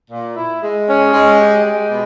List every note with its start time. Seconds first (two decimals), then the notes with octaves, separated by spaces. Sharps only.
0.11 A#2
0.36 E4
0.62 G#3
0.87 C#4
1.13 G#3
1.39 G4
1.64 G#3
1.89 B2